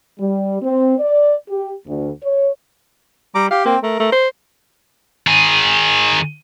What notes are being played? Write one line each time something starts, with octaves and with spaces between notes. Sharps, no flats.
G3
C4
D5
G4
D2
C#5
G3 A#5 D6
G4 F5
A#3 C4
A3 A#4
A3
C5
D#3 G#4